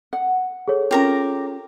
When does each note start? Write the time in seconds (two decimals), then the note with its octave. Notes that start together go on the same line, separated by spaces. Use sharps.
0.13 F#5
0.68 G#4 A4 C#5
0.91 C#4 F4 G4 A#4 A#5